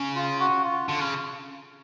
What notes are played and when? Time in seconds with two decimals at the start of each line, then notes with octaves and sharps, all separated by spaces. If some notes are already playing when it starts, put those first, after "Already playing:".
Already playing: C#3
0.15 F4
0.40 F#4
0.64 F4
0.89 D3
1.01 C#3